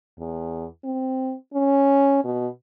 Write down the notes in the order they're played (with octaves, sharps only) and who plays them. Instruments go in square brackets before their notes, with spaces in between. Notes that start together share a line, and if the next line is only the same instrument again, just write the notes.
[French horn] E2
C4
C#4
B2